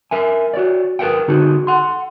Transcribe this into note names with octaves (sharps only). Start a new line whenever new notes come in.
A#4 E5 G#5
F#4 C#5 D5
G#4 A#4 B4 E5 F5 G5
D3 D#4 F#4 G#4
F#5 C6